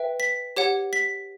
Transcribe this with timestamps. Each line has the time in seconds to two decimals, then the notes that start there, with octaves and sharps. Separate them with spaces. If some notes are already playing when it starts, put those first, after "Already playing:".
Already playing: B4 E5 G5
0.20 B6
0.57 G4 C#5 F#5
0.93 B6